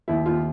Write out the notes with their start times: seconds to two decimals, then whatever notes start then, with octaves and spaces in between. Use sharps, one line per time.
0.08 D#2 E4
0.26 D#2 F4